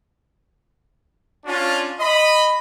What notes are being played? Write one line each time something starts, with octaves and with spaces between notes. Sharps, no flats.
C#4 D4 F4
D#5 B5